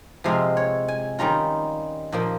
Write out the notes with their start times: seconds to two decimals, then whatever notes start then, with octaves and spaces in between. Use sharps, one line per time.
0.24 C3 F3 G#3 C4 F5
0.57 C#5
0.88 G#5
1.19 D#3 G3 C#4 F4 A#5
2.12 A#2 F3 A#3